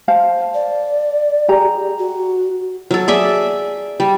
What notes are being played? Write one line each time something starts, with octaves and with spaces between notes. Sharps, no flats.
C5 F5 A5
D5
G4 G#4 A#5
F#4
F#3 A4
G#4 D5 E5
G3